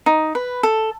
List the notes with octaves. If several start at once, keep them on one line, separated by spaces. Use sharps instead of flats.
D#4
B4
A4